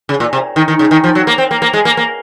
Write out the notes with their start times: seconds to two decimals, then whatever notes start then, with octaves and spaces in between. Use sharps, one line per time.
0.09 C#3
0.20 A#2
0.33 C3
0.56 D#3
0.68 D#3
0.79 C#3
0.91 D#3
1.04 F3
1.15 F#3
1.27 A#3
1.38 C4
1.51 A#3
1.62 A#3
1.73 G#3
1.85 A#3
1.97 A#3